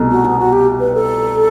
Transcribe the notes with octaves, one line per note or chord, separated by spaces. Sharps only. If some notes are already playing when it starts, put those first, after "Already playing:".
Already playing: C2 B2 A3
F#4
B3
F#4
G4
B4
A4